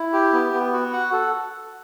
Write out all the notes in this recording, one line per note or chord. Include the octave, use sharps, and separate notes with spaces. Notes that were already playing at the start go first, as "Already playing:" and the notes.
Already playing: E4
G4
B3
B3
F#4
F#5
A4